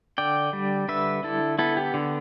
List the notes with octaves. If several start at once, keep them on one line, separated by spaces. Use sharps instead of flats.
D3 D5 G5
G3
D3 B4 E5
D3 E4 A4
B3 E4 A4
G4
D3